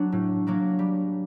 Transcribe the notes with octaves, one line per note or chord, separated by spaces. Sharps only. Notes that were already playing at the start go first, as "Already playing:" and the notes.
Already playing: F#3 D4
A2
F#3 A#3 D4
G3